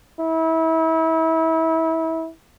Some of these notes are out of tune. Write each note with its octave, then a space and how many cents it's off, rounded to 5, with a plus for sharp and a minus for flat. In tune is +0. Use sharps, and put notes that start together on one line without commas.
E4 -30